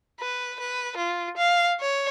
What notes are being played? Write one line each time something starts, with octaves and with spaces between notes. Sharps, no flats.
B4
B4
F4
F5
C#5